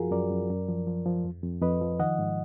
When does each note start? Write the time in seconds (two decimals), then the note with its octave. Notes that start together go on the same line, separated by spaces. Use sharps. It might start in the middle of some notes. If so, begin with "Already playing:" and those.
Already playing: F#2 F3 F4 F#4 G#4 A#4
0.11 F#2 A#4 D5
0.31 F#2
0.49 F#2
0.68 F3
0.87 F3
1.06 F3
1.25 F2
1.44 F2
1.62 F2 B4 D#5
1.81 F3
1.99 D#3 D#5 F#5
2.19 G#2